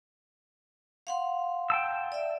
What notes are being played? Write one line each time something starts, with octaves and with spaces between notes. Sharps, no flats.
F5 F#5 C6
G5 A5 E6
D5 E5